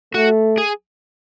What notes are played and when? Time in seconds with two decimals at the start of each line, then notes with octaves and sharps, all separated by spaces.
0.14 A3 F#4
0.58 G#4